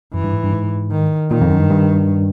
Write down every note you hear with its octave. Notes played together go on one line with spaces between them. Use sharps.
F#2 E3
G2
G#2
G2
G#2
D#3
A#2 D#3
F2
F#2
G2
G2